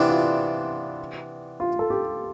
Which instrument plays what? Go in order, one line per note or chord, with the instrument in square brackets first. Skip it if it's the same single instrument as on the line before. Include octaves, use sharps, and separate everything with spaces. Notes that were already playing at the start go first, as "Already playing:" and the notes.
Already playing: [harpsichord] C3 E3 B3 D4 [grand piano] E4
[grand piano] F4
F4
A4
G4